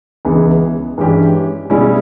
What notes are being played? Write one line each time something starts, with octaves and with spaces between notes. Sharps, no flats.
C#2 C#3 E3 G#3 B3
G2 E3 G#3 C#4 G4
B2 G3 C#4 E4 G#4